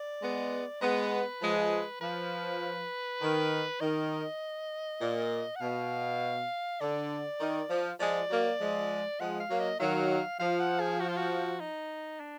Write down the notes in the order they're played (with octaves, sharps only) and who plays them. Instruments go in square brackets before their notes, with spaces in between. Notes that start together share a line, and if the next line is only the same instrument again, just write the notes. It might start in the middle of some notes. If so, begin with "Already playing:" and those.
Already playing: [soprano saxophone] D5
[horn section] G#3 B3
[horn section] G#3 B3 [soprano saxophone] B4
[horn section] F3 G#3
[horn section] F3 [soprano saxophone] B4
[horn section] D#3
[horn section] D#3 [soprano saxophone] D#5
[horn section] A#2
[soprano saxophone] F#5
[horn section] B2 [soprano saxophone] F5
[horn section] D3 [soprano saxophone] D5
[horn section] D#3
F3
[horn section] F3 G#3 [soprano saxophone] D5
[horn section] F#3 A#3
F3 G#3
[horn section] F3 G#3 [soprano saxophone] F#5
[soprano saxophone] F5
[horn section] F#3 A#3
[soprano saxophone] D#5
[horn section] D#3 F#3 [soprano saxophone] F5
[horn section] F3 [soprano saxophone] F5
[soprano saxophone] F#5
G#4
F#4
F4
F#4
D#4
D4